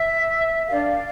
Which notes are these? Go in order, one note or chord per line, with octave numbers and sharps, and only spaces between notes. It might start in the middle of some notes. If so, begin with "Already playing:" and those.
Already playing: E5
D4 G4 A#4 D5 F5